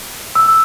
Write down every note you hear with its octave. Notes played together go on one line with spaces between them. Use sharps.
E6